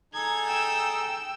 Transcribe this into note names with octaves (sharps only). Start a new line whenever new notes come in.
D#4 G#4 A4 G#6
G5 E6